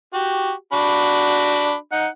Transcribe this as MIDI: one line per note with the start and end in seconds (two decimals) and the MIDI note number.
0.13 0.52 66
0.13 0.52 67
0.73 1.74 62
0.73 1.74 66
0.73 1.74 83
1.92 2.07 63
1.92 2.07 78